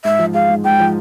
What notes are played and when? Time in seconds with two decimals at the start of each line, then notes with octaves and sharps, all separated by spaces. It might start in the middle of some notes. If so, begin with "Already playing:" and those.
0.04 G#2 E5
0.19 F3
0.34 G#3 F5
0.49 G#2
0.64 G#2 G5
0.80 F3